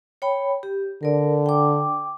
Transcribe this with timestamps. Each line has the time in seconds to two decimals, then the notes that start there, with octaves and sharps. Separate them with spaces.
0.22 C#5 G5 B5
0.63 G4
1.03 D3 A#4 D5
1.46 G5 D6